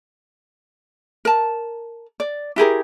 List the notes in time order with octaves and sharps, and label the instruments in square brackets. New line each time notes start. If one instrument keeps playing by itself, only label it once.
[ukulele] A#4 A5
D5
E4 G4 G#4 A#4